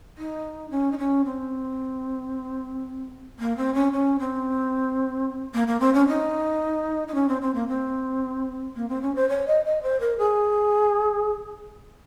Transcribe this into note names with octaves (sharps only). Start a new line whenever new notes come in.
D#4
C#4
D#4
C#4
C4
A#3
C4
C#4
C#4
C4
A#3
A#3
C4
C#4
D#4
D#4
C#4
C4
C4
A#3
C4
A#3
C4
C#4
C5
C#5
D#5
D#5
C5
A#4
G#4